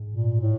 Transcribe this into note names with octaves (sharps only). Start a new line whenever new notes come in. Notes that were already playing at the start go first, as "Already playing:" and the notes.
Already playing: G#2
A#2
A2